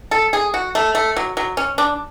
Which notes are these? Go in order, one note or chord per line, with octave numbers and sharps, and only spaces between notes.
A4
G#4
F#4
A3
A3
F#3
F#3
C#4
D4